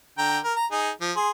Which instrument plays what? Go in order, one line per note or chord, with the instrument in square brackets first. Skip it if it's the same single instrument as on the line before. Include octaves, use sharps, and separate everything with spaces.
[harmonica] D3 G5 A#5
A#4
A#5
D#4 G#4
F3
G#4 C6